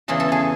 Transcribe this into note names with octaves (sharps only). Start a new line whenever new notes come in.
E2 C#3 E3 G#4
A4
G#4